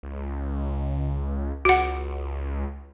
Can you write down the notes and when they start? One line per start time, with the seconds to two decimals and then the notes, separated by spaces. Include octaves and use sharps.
0.03 C#2
1.65 C#2 F#4 F#5